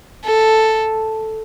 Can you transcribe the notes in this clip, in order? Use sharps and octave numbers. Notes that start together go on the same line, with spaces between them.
A4